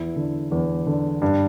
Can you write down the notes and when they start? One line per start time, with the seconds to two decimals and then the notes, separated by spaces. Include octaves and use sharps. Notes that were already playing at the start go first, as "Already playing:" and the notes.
Already playing: E2 E4
0.16 D3
0.51 E2
0.86 D3
1.22 G2